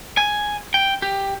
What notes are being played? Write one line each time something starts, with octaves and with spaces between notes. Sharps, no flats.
G#5
G5
G4